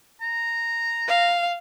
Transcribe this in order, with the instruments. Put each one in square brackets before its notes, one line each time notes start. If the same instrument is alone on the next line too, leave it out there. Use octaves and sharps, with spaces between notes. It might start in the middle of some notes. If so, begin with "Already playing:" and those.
[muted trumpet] A#5
[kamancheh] F5